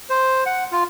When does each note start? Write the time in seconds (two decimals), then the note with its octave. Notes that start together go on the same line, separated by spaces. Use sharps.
0.10 C5
0.46 F#5
0.72 F4